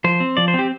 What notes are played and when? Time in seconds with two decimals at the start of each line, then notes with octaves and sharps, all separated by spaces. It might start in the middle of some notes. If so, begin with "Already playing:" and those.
0.04 F3 C5
0.20 C4
0.37 F3 D5
0.48 C5
0.54 C4 G4